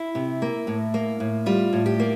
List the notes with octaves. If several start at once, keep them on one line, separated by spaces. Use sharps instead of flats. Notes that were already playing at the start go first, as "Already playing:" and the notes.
Already playing: E4
C3
A#3
A2
A#3
A2
G3 F4
A2
G4
A#3